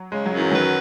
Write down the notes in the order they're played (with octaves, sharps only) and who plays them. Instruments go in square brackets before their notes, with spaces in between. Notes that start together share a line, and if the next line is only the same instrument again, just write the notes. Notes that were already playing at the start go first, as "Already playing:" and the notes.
Already playing: [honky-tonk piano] F#3
[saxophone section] C#3 [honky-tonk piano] G#3
[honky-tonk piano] F#3
[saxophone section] F#2
[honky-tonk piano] E3
[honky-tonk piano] D#3 F#3 [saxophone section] B4